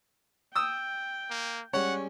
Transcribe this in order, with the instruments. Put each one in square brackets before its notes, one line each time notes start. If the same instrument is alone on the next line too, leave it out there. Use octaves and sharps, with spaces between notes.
[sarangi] G5 [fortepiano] D#6 E6
[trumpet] A#3
[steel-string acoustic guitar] G3 G#3 C#4 [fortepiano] C#5 [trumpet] F#5